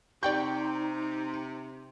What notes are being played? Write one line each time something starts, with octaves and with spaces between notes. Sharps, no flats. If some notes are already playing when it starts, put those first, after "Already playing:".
C3 D#4 D5 G5 C#6 G6